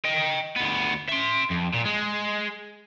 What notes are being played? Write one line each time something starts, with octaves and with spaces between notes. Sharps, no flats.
D#5 G5
D2 B3
E5 C6
F2
A#2
G#3